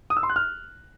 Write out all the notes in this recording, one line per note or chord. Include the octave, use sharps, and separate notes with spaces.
D#6
E6
C6
F#6
F6